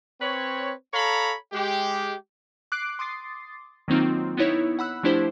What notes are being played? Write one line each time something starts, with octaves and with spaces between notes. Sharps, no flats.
C4 B4 C#5
A4 C#5 F5 A#5 B5
G#3 G4
D6 F#6 C7 D7
C6 D6 D#6 A6 C7
D#3 F#3 A#3 C4 D#4 F4
B3 D#4 E4 C#5
F#5 B5 E6 F#6
F3 A3 D4 E4 G4 C5